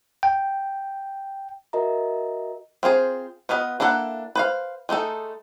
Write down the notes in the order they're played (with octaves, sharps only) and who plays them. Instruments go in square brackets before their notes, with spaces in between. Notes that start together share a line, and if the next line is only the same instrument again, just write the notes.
[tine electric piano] G5
[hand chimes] F#4 A#4 D#5 E5 A#5
[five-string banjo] C4 F4 G#4 C5
B3 F4 B4 D#5
A#3 D4 E4 A4 F#5
B4 C5 F5
G#3 A3 D#4 A4